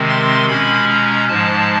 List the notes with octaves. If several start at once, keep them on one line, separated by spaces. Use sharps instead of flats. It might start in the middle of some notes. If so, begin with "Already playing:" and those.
Already playing: C3 D#3 G#3 C4
C6
B2 G#3 C#4 B5
A#5
G#2 F3 G#3 A5